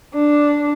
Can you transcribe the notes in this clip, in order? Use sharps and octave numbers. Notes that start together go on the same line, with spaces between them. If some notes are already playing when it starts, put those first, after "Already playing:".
D4